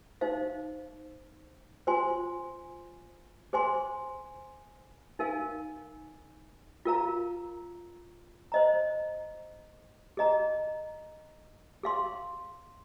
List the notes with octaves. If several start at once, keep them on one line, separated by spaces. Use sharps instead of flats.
D#4 C5 F5
F4 C5 G#5 C6
G#4 C5 G#5 C6
D#4 A#4 F5 G#5
F4 A#4 F5 A#5
C5 D#5 A#5
G#4 D#5 A#5
G#4 F5 C6